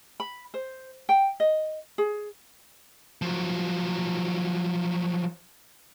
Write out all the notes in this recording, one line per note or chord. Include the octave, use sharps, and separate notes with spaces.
B5
C5
G5
D#5
G#4
F3 F#3